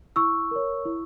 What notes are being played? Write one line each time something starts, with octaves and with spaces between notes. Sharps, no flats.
E4 C#6 E6
A#4 C#5
E4